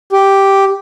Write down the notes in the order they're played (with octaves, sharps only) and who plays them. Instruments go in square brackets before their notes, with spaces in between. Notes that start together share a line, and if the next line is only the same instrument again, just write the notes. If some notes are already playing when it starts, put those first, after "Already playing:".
[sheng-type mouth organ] G4